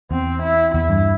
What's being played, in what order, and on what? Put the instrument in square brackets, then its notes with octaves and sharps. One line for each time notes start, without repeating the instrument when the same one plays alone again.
[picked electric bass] E2 [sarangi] C4
[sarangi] E4
[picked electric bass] E2 [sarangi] E4
[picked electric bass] G2